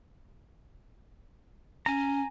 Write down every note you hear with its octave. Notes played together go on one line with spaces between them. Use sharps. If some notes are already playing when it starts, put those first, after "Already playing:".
C#4 G#5 A#5